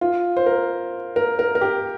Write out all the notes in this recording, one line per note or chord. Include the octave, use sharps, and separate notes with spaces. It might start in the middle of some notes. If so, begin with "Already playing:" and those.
F4
C5
A#4
A#4
A#4
A#4
G4